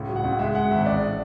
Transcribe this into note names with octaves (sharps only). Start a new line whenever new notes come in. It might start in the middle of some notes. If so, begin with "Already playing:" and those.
Already playing: C#2 A2
F#3
F#5
C#2
G#3 E5
G#3 F#5
G#1 E5
A1 D5